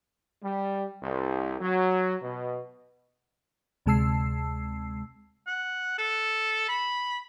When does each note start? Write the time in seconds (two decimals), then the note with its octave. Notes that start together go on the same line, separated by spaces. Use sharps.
0.42 G3
1.02 C2
1.61 F#3
2.23 B2
3.86 D2 C3 G#3 A5 E6 C7
5.47 F#5
5.98 A4
6.69 B5